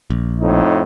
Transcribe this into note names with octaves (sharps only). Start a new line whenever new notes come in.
A#1
F2 A2 D#4